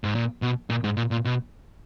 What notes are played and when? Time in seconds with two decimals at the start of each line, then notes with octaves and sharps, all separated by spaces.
0.04 G#2
0.15 A#2
0.42 B2
0.70 A#2
0.84 G#2
0.97 A#2
1.11 A#2
1.25 B2